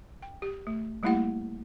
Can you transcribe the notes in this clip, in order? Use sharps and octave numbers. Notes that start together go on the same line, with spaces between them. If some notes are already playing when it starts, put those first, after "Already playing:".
G5
G4
A3
G3 A3 A#3 E4 G4 F#5